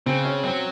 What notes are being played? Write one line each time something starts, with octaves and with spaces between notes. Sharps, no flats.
C#3 C4
C#4
F#3 C4